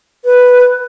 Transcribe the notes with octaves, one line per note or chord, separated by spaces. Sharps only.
B4